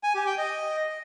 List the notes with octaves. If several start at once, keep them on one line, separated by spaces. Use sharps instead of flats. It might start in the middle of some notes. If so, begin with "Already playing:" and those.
G#5
G4
G5
D#5